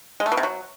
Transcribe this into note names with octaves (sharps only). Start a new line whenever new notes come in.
G#3
A3
B2
C3
F#3